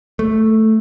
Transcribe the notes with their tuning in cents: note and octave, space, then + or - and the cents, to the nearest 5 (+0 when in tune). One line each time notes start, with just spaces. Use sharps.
A3 +0